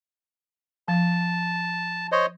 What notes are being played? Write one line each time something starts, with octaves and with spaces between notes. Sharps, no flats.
F3 A5
C5 C#5 D#5